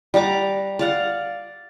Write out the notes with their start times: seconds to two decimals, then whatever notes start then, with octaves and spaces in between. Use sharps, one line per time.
0.14 G3 F#5 A#5 D6
0.79 D5 F5 F#5